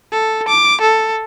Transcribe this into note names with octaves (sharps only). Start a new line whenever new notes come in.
A4
D6
A4